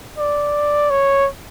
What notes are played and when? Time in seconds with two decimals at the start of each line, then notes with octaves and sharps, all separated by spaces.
0.18 D5
0.90 C#5